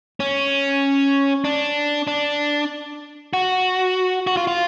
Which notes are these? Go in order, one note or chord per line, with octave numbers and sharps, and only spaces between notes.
C#4
D4
D4
F#4
F#4
F4
F4